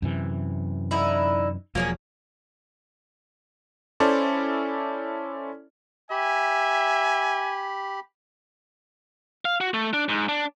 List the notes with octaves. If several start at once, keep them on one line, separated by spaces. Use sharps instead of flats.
F#2 C3 E3
D3 D#4 E4
E1 F3 F#3 A#3 C#4 G#4
C#4 E4 A4 C5 D5
G4 E5 G#5 B5
F5
F#4
A3
D4
G#2
D4